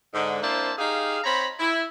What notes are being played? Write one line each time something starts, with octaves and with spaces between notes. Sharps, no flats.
G#2 D3
A#3 C4 D4 E4 C5 A5
D#4 G4 G#4 F5
C4 C#5 A#5 B5
E4